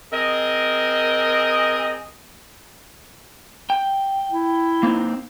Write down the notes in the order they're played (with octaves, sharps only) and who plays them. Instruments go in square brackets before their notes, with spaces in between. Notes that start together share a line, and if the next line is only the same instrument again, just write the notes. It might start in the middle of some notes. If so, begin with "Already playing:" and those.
[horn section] C4 G#4 A#4 D#5
[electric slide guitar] G5
[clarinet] E4
[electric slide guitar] A#3 C4 D#4